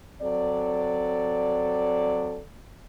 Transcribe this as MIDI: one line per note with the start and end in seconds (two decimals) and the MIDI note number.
0.22 2.40 54
0.22 2.40 60
0.22 2.40 69
0.22 2.40 74